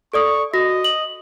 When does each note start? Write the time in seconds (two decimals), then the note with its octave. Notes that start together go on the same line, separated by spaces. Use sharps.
0.13 A4 D5 C#6 D#6
0.54 F#4 D#5 A#6
0.84 F#7